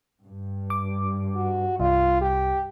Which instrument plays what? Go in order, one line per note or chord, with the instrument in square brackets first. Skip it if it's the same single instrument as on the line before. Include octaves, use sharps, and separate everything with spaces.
[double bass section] G2
[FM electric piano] D6
[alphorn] F#4
[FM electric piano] C2 [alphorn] F4
[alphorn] G4